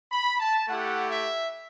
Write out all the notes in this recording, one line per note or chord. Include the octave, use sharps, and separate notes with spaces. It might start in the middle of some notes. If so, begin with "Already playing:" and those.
B5
A5
A3 E4 G4 F#5
E5